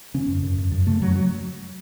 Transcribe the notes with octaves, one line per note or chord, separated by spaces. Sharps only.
C#3 C#4
F#2
F#2
F#2
F#2
C#3 A3
F#2 F#3
F#3